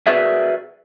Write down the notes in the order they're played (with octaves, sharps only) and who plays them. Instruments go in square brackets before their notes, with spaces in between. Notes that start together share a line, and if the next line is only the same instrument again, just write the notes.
[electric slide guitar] F#4 G#4 A#4 B4 D5 E5